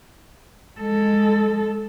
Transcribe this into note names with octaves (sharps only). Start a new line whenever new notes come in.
G#3 A4